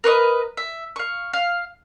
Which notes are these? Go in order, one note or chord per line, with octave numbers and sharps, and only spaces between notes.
A#4 B4 C#5 D#5
E5
F5 C#6
F5